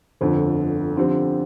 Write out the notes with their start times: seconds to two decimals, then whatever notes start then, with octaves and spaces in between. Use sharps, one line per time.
0.21 G1 F2 D3
0.97 D3 F3 C4 G4